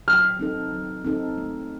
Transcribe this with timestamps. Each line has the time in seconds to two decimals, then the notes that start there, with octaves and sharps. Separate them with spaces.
0.08 F#3 F6
0.39 C4 D#4 A4
0.72 F#3
1.05 C4 D#4 A4
1.38 A3